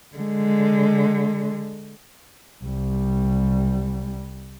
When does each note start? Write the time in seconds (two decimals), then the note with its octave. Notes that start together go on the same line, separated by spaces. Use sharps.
0.16 D3 G#3
2.63 C2 G3